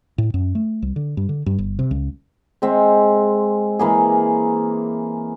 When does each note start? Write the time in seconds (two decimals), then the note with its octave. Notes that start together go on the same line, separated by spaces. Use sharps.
0.18 A2
0.34 F#2
0.55 A3
0.82 C2
0.96 D3
1.17 G2
1.29 D3
1.46 G2
1.58 G1
1.79 C3
1.91 C#2
2.62 G#3 C4 E5
3.79 E3 A#3 G#4